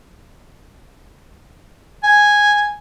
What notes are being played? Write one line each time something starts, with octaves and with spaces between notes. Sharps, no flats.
G#5